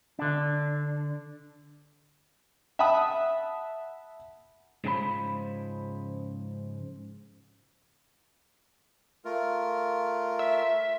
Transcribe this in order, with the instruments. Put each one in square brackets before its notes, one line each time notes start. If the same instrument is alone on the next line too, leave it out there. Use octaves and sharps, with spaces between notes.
[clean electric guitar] D3 D4
[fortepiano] E5 F#5 A5 B5 D#6
[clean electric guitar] G#2 C#3 F3 G#4 C5 B5
[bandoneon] A3 F4 A#4
[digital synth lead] E5